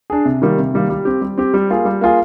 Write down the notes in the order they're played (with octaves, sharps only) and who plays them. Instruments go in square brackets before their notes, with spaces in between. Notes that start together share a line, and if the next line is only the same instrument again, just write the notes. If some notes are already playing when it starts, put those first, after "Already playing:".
[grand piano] D4 G#4
C3
D#3 G3 A#3
C3
D#3 G3 A#3
G3
C4 G4
G3
C4 G4
G3
A#3 F4 G#4
G3
A#3 F4 G#4